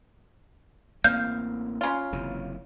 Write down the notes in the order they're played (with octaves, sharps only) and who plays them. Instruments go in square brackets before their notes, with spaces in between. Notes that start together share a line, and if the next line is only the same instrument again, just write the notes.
[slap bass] A1 A#3 C4 [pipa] F5 [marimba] G6
[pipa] C#3 F4
[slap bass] F#1 C3 E3